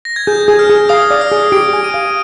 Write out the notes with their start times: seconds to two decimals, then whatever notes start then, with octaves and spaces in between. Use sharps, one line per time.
0.05 A#6
0.16 G#6
0.27 G#4 G6
0.48 G#4
0.59 F6
0.70 G#4
0.89 F5 D#6
1.11 D5
1.21 F6
1.32 G#4
1.52 G4 D7
1.73 G#5
1.84 D#7
1.94 F5